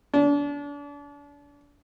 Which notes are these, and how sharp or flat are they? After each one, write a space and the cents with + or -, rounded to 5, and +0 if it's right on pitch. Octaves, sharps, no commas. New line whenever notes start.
D4 -35